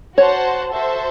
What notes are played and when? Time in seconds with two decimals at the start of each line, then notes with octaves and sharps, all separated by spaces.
0.17 F#4 C5 C#5 F#5 A5
0.73 F#4 A4 C5 E5 A5